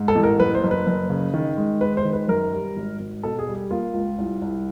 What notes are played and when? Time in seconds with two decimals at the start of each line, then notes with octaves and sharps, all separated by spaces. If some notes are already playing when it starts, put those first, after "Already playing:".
Already playing: G#2
0.08 A4
0.16 A1
0.23 A#4
0.39 F#1 B4
0.55 C5
0.64 F#1
0.71 B4
0.87 F#1
1.10 C#3
1.34 D#3
1.57 G#3
1.81 G#3 B4
1.97 C5
2.05 D#3
2.13 B4
2.28 F#2 A#4
2.53 G3
2.76 G#1
3.00 G#1
3.23 B2 A4
3.39 G#4
3.47 G3
3.54 G4
3.71 A#3 F4
3.94 C#2
4.18 C2
4.42 C2